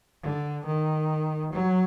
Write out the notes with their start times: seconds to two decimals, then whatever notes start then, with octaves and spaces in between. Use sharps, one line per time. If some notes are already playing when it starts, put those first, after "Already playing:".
0.23 D3
0.65 D#3
1.53 F#3